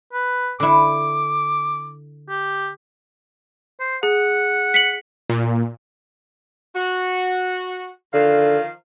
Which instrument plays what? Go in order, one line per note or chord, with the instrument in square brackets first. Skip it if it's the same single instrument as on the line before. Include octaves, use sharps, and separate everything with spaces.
[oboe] B4
[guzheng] D3 E4 [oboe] D6
[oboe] G4
C5
[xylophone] G#4 [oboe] F#5
[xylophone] B6 C#7 F#7
[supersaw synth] A#2
[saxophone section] F#4
[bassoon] D3 [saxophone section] D#3 F3 F5